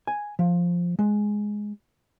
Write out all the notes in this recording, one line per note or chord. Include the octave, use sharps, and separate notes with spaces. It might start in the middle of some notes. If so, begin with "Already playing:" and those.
G#5
F3
G#3